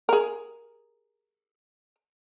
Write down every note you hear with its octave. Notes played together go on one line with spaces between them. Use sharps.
G#4 A#4